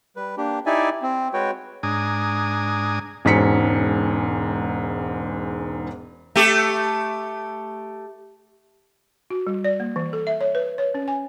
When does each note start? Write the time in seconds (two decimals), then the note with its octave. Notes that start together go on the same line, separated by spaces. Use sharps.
0.16 G3 B4
0.38 A#3 D4 G4
0.66 D#4 E4 G4 D5 E5 G#5
1.02 C4
1.33 G#3 F#4 B4 C#5 G5
1.83 G#2 D4 G#5 A#5 D#6
3.25 E1 G#2 C#4 B6 C#7
6.36 A3 G4
9.30 F#4
9.47 G3
9.64 D5
9.80 A#3
9.96 E3
10.13 A4
10.27 E5
10.41 C#5
10.55 B4
10.78 C#5
10.94 C#4
11.08 G#5